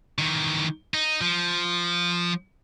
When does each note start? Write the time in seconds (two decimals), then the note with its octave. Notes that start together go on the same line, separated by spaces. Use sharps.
0.18 D#3 E3
0.94 D#4
1.21 F3